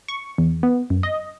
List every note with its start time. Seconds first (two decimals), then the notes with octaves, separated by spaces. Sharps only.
0.08 C#6
0.38 E2
0.63 B3
0.90 F#2
1.03 D#5